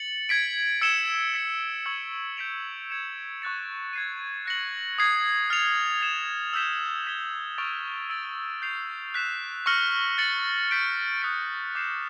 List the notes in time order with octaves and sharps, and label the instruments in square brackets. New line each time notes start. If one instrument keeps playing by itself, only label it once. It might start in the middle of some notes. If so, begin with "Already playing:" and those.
Already playing: [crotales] A6 C#7 F#7
G#6 B6 D7
E6 G#6 C#7 E7 G7
G#6 B6 E7
C#6 E6 G#6 C#7 F#7
G6 B6 D7 F7
G#6 C#7 E7
C#6 F#6 A6 C#7
G#6 C7 D#7
F#6 A#6 C#7 F#7
D#6 G#6 C7
F6 A6 C#7 F7
G#6 C7 E7
E6 G6 B6 E7 G7
G#6 B6 E7 G7
C#6 F6 A6 D7 F7
E6 A6 D7
G6 C7 F7
F#6 B6 E7
C#6 F6 A#6 C#7 F#7
A6 C#7 F#7
G6 B6 D7 F#7
D#6 F#6 B6 D7
D6 G6 C7 E7